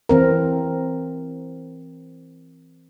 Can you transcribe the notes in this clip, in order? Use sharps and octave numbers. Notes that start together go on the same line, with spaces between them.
E3 C4 A#4